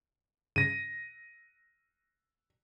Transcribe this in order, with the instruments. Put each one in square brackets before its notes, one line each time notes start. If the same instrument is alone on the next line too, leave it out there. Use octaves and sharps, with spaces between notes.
[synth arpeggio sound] G2 C#3 G#6 [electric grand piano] A#6 D#7